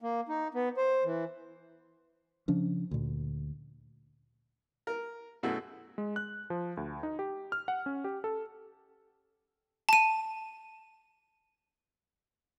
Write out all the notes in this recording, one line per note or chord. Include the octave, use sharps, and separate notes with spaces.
A#3
D#4
B3
C5
E3
C#3 F3 C#4 D4
D2 A#2
A#4
F#2 B2 A3 E4 F#4 G#4
G#3
F#6
F3
D2
D#4
G4
F6
F#5
C#4
G4
A4
A5 D#7